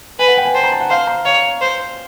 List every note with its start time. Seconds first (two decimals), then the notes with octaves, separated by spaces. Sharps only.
0.19 B4 G#5
0.28 F#5
0.37 G5
0.45 G#5
0.54 C5 A5
0.63 A#5
0.72 A5
0.81 F#5
0.90 C5 F5
1.07 A#5
1.25 C#5 F5
1.61 C5